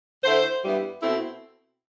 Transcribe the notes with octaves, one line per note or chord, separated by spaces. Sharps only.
D3 A3 E4 C5
G2 E3 G3 B3 E4
B2 A3 C4 E4